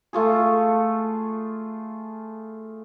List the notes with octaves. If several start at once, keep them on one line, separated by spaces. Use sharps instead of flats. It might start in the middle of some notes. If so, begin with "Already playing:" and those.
A3 F4 G#4